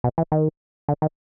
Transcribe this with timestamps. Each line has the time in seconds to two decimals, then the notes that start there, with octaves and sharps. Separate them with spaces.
0.04 B2
0.18 E3
0.32 D#3
0.88 D3
1.02 D#3